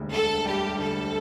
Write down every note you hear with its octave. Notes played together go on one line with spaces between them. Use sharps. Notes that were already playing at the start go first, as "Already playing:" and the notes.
Already playing: E1 D2 D3 G3
D3 A4
G3 G4
D2 A4